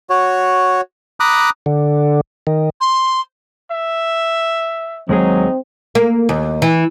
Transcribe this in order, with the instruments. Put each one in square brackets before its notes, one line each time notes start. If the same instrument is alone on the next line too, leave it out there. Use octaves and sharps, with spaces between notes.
[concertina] F#4 C#5
A#5 B5 D6 D#6 F#6
[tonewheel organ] D3
D#3
[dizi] C6
[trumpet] E5
[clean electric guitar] D#2 G#3 G#4 [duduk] F#3 [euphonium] C4 [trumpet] D#4
[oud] A#3
D#2
E3